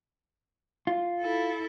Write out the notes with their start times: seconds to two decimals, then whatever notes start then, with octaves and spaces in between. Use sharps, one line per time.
0.87 F4
1.20 E4 A4